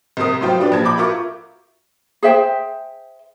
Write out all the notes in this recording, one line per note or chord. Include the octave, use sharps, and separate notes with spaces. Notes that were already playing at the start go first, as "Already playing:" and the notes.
C2 C3 A#4 D#6
A2 F#3 F4 C5 G5
F#3 D4 G4 B4 D5
A#1 F3 A5 G#6
B5 D6 G6
F4 F#4 A#4 E5 C#6 D6
G#4 C5 E5 G5